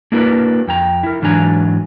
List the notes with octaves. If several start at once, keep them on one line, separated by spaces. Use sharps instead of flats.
A#3 D4 E4 F#4 A#4 B4
F2 G5 A#5
E4 A#4
G#2 E3 F#3 D4 G#5 A#5